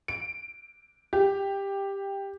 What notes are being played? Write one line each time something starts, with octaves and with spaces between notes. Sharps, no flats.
D7
G4